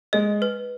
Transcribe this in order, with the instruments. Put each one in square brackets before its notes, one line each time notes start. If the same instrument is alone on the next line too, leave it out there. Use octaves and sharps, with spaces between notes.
[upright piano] G#3 [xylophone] D#5
[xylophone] B4